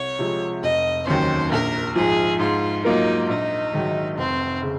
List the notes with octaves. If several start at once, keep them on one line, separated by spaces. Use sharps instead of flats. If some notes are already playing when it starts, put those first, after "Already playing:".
Already playing: C2 C#5
C3 F3 G#3
F1 D#5
D#2 D#3 F#3 C#4 C5
A#1 A#4
G#2 F3 G#4
G#2 F4
F#3 A#3 D#4 F4 A#4
A#1 D#4
G#2 D#3 F#3
F1 C4
C#3